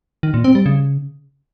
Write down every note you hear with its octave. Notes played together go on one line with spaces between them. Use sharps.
D#3
A#2
C4
G3
C#3